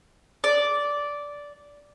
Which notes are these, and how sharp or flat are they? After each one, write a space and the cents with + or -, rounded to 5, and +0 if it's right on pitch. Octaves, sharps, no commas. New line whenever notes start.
D5 -10